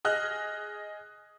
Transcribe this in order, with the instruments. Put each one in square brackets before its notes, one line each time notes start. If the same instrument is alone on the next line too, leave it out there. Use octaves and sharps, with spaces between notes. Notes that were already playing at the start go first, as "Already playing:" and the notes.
[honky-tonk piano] G#4 D#5 F6 F#6